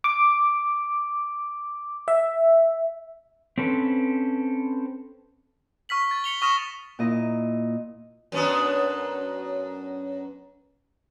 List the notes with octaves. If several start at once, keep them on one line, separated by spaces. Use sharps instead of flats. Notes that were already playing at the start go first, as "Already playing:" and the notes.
D6
E5
C4 C#4 A4 B4
C#6 F6 B6 F#7
A6
C#7 F7 G7
C#6 D#6 F6 A#6 E7
A#2 E4 D#5
F#2 B3 D4